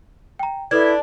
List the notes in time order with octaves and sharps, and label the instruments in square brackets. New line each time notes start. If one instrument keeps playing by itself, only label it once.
[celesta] G5 A#5
[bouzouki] D4 [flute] E4 [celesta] A4 B4 G#6